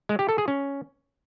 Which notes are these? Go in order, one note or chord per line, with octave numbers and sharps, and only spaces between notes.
G#3
G4
A4
G#4
C#4